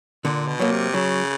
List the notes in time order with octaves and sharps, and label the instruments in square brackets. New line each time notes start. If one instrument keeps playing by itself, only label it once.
[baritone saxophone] A#2 [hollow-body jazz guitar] D3
[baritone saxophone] B2
[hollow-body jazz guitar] F#3 A#3
[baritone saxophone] C3
[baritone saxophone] C#3 [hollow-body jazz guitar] F#3